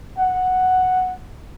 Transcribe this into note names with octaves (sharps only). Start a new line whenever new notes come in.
F#5